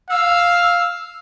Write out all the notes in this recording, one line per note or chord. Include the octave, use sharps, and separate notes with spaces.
F5 E6